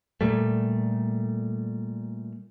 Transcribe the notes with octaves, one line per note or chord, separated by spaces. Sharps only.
A#2 G3 A3